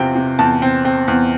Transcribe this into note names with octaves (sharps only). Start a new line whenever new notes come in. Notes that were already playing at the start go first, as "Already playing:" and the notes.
Already playing: E2 C3 F3 C4 G5
C3
E2 A5
C4
C4
E2